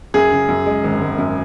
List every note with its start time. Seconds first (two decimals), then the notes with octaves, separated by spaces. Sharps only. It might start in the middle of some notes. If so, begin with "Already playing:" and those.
0.14 F#2 G#4
0.32 C#3
0.48 F#2
0.66 G#3
0.84 G#1
1.01 G#1
1.18 F#2